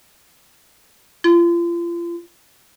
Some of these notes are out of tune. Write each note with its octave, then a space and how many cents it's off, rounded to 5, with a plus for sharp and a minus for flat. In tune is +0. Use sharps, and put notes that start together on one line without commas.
F4 -35